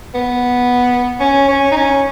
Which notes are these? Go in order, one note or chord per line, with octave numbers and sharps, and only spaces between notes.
B3
C#4
C#4
D#4
C#4